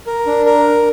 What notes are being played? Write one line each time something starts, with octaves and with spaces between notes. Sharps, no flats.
A#4
D4
A#4